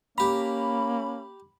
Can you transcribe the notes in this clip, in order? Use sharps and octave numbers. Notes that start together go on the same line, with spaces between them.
A#3 C#4 G4 A#5 B5